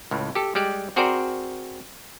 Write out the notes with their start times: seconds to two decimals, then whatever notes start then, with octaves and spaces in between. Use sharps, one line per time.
0.11 C#2 A2
0.35 G4 A4
0.55 G3 G#3 G4 D5
0.96 C4 F#4 G#4 A#4 C5 D5